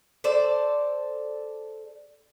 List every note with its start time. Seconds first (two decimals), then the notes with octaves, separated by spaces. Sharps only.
0.24 A4 C5 D5